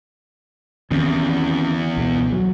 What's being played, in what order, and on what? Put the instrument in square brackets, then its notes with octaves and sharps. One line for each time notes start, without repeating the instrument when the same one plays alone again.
[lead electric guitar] E2 [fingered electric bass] D#3 C4 C#4
[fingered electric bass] C#2 B2
F#3